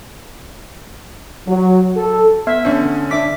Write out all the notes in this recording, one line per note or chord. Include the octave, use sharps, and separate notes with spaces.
F#3
A4
B3 E5
D3 C#4 D4
D4 E5 D6 B6